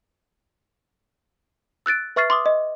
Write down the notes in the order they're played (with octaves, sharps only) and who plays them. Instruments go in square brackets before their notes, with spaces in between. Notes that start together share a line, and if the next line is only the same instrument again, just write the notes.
[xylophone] E6 F#6 A6 D7
B4 E5 C#6 F6 A6 C7
C6 D6 D#6
D#5